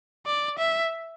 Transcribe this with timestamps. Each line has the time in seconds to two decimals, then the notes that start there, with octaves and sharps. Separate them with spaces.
0.26 D5
0.58 E5